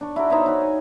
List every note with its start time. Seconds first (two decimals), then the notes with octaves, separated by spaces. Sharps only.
0.01 D4 C#6
0.16 E4 F#4 A#4
0.30 D#4 C5 C#5 E5
0.46 D#4 F#4 B5
0.61 G#5